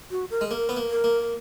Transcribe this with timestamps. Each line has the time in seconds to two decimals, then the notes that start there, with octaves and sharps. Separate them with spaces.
0.11 F#4
0.30 A#4
0.41 G#3
0.50 A#3 A#4
0.69 B3
0.77 A#3
0.90 A#4
1.04 A#3